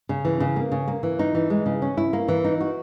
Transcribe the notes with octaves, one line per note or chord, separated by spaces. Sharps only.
C#3
E3
C#3
A#3
C#3
A#3
E3
D#4
E3
G#3
C#3
C#4
E4
A#3
E3
D#4
F#4